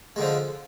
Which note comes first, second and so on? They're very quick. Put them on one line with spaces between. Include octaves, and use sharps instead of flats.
G#3 D3 F3